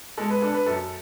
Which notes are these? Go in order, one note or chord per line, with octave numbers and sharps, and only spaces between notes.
G#3 A4
B4
D4 A4
B4
F#2 A4